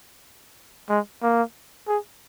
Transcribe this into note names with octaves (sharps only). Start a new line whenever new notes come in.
G#3
A#3
G#4